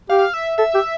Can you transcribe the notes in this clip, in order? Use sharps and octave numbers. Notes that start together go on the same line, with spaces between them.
G4 F5
E5
A4 E5
G4